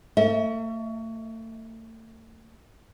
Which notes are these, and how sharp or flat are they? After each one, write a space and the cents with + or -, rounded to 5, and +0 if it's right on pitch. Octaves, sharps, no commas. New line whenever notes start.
A3 +40 E5 -40